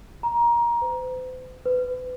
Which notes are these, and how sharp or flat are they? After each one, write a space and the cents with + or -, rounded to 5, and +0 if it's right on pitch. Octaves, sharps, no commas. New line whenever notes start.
A#5 +20
C5 -45
B4 +35